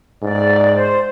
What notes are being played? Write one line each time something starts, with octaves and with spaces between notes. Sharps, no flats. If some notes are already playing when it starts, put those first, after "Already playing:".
G#2 D5
C5